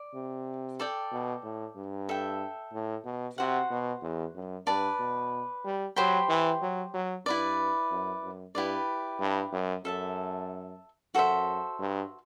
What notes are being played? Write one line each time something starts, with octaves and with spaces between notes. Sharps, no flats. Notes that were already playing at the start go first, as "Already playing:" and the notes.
Already playing: D5
C3
A4 D5 G5
B2
A2
G2
A4 E5 G5
A2
B2
C3 F#4 C5 F#5
B2
E2
F#2
G2 B4 D5 A5
B2
G3
F#3 G4 C5 G5 B5
E3
F#3
F#3
G2 E4 B4 D5
F#2
F#2
G2 E4 G4 B4 D5
G2
F#2
F#2 A4 E5 A5
F#2 F#4 A4 C5 E5
G2